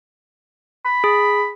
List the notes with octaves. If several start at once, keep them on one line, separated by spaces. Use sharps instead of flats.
B5
G#4